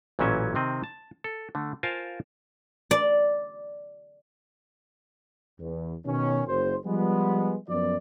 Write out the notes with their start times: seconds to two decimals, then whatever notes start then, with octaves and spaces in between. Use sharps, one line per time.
0.19 A1 A#2 E3 F#3 C#4 E5
0.55 C3 D#3 C4 D#5
0.84 A5
1.24 A4
1.55 D3 A3
1.83 F4 A#4 C5 F5 G#5 A5
2.91 D5
5.60 E2
6.06 B2 D#3 C#4
6.47 F#1 C5
6.85 F3 G3 G#3 B3
7.68 F#2 F3 B3 F4 D5